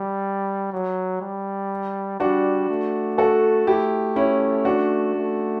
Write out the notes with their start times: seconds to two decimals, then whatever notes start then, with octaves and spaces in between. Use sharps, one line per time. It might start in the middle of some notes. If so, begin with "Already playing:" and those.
Already playing: G3
0.72 F#3
1.21 G3
2.20 G3 D4 F#4
2.69 A3
3.18 F#4 A4
3.67 A3 E4 G4
4.16 C#4 E4
4.65 D4 F#4
5.15 A3